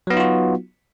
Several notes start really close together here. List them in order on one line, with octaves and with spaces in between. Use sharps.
F#3 B3 D#4 F4 F#4